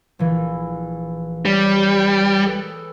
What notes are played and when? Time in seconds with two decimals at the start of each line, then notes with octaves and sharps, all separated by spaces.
0.19 A#1 E3
1.46 G3 C#5
2.44 G#4 A4 B4